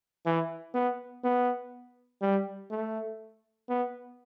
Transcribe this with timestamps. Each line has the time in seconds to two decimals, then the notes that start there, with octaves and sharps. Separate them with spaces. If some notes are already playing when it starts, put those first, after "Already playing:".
0.26 E3
0.74 B3
1.24 B3
2.22 G3
2.71 A3
3.69 B3